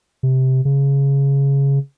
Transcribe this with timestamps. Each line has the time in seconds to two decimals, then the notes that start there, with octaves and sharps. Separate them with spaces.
0.23 C3
0.65 C#3